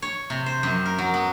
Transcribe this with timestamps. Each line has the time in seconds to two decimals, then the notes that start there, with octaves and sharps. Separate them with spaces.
0.02 C#5
0.30 C3
0.46 C5
0.63 F#2
0.86 A#4
0.98 F#3
1.14 B3